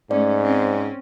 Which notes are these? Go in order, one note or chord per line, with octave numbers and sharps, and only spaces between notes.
G#2 A3 C#4 D5
C4 C#4